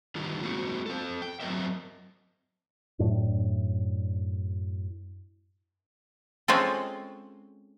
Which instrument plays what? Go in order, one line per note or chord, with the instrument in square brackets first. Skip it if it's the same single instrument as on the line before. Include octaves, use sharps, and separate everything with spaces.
[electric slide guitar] D3 D#3 G3 D#4 F4
G#3 A#3 C4 E4 F#4
C4 A4
G5
F#3 C4 C#4 A#4 D#5 E5
[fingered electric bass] F#2 A2 D4
[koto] G#3 C4 C#4 F4 A4